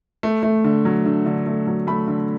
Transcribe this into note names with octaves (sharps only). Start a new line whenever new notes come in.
A3
A3
D3
F#3
D3
D3
A3
F#3
A3 B5
D3